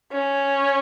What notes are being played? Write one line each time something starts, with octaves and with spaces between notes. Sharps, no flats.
C#4